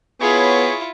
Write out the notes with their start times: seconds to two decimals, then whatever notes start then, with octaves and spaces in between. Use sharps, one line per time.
0.21 B3 E4 F4 G#4 C#5 B5 C#6